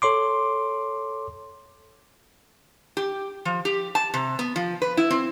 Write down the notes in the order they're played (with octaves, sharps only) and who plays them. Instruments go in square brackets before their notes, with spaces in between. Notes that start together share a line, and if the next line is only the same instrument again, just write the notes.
[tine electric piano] A4 C#5 C6 D6
[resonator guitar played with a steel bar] G4
F3
G4
A5
C3
B3
F3
B4
E4
C4